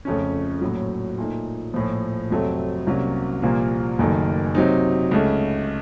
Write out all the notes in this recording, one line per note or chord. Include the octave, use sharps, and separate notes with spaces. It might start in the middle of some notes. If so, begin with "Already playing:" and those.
F2 C#3 A3 C#4
A#1 A2 F#3
A#2 A3 D#4
A#1 A2 F3
F2 C3 F#3 A3 C4
C2 C3 F#3 A#3 C#4
C2 A#2 F3 A#3
F#1 F#2 D#3 A3
C3 F#3 C4 D#4
C#2 C#3 A3